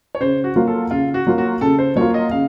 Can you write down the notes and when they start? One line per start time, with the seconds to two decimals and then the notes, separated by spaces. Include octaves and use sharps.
0.15 C#5
0.20 C#3 C5
0.44 F#4
0.56 F#3 A#3 F4
0.67 A4
0.91 C#3 F4
1.14 F#4
1.27 F#3 A#3 F4
1.38 F#4
1.61 C#3 A4
1.78 C5
1.96 F#3 A#3 F4 C#5
2.14 D#5
2.31 C#3 F5